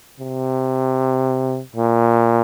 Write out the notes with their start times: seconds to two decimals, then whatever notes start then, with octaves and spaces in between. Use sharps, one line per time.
0.20 C3
1.76 A#2